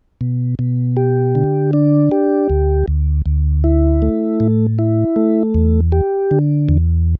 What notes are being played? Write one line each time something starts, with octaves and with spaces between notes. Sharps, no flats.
B2
B2
G4
D3
D4
G4
D2
D2
D2
E4
A3
A2
E4
A3
E2
G4
D3
E2